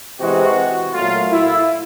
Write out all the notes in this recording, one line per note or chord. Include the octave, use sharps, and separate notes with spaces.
C3 E3 G#3 F#4
A#2 F#3 A3 F4
E4